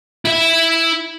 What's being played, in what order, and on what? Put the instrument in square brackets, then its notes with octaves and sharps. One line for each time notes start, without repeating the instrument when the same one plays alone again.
[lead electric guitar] E4 E5